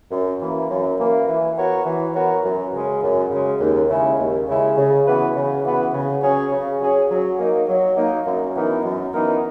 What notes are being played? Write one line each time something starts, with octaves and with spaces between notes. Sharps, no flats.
F#2
E3 A#3
F#2
E3 A#3
E3
B3 F#4 A#4 C#5
E3
B3 F#4 A#4 C#5
F#2
C#3 G#3 C#4
F#2
C#3 G#3 C#4
D#2
C#3 G#3 C#4 E4
D#2
C#3 G#3 C#4 E4
C#3
E3 B3 F#4 B4
C#3
E3 B3 F#4 B4
C#3
F#3 C#4 G#4 C#5
C#3
F#3 C#4 G#4 C#5
F#3
A#3 D#4
F#3
A#3 D#4
F#2
E3 B3 D#4 A#4
F#2
E3 B3 D#4 A#4